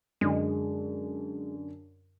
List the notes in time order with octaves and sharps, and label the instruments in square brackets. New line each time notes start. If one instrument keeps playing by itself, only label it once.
[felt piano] F#2 D3 [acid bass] G#3